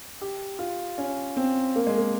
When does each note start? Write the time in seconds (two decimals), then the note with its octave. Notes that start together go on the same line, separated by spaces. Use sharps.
0.21 G4
0.59 F4
0.98 C#4
1.37 C4
1.76 A#3
1.87 G#3
1.98 A#3